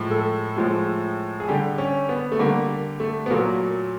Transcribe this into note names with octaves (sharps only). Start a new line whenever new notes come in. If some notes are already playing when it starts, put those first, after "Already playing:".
Already playing: A2 F3 G#3
A4
A2 F3 G#3
G#4
D3 G3 G4
C#4
B3
A3
D3 G3 A#3
A3
B3
A#2 F#3 A3 A#3